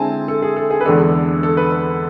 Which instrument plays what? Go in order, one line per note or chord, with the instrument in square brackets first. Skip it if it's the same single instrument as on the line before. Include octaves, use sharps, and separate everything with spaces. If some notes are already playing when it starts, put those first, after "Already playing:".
Already playing: [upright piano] D3 G#3 C4 E4 G#5 A5
A4
G#4
A4
G#4
B4
E2 D3 G#3 D4 A4
A4
B4
B4